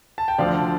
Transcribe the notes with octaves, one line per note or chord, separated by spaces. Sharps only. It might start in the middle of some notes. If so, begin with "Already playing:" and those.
A5
G5
D2 D3 F3 D5 F5